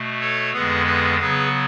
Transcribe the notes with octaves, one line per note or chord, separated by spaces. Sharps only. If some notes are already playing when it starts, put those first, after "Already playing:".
Already playing: B2 A3
A4 C#5
F2 D3 G#3 B3 G#4 B4
G#4 B4
C#3 F#3 B3 G#4 B4